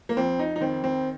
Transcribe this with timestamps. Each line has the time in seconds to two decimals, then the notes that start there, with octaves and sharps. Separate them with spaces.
0.09 A#3
0.17 F2 C4
0.39 D#4
0.56 D#4
0.61 D#3 C4
0.84 C4